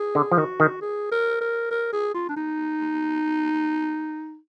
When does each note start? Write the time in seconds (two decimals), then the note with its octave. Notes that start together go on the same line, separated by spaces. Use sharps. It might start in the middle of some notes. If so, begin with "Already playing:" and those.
Already playing: G#4
0.15 D3
0.31 F3
0.37 D#3 F#4
0.60 D#3
0.81 G#4
1.12 A#4
1.41 A#4
1.71 A#4
1.93 G#4
2.15 F4
2.29 D4
2.37 D#4